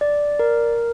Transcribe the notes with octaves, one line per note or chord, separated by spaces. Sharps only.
D5
A#4